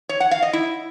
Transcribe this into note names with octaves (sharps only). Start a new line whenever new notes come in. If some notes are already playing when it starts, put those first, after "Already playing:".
C#5
F#5
F5
D#5
E4